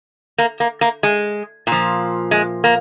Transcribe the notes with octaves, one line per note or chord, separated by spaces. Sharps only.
A#3
A#3
A#3
G#3
A#2 F3
G#3
A#3